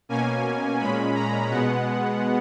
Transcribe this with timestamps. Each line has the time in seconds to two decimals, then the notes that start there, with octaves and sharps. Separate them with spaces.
0.09 B2 A#3 C#4 G#5
0.79 A#2 G#3 C#4 B5
1.14 A#5
1.49 B2 G#3 B3 F#5